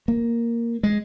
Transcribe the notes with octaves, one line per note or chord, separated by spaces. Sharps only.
A#3
G#3